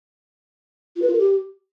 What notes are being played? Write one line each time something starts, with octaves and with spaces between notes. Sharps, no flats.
F4
B4
F4
A#4
G4